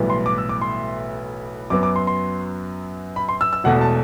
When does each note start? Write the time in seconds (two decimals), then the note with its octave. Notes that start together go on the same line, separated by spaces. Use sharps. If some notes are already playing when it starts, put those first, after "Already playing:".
Already playing: B1 A2 E3 G3 B3
0.10 C6
0.26 D6
0.38 E6
0.49 D6
0.62 C6
1.70 F#2 F#3 B3 D6
1.83 D6
1.96 C6
2.07 C6
3.16 B5
3.29 C6
3.41 E6
3.53 E6
3.64 E1 E2 B2 A3 F#5
3.81 A5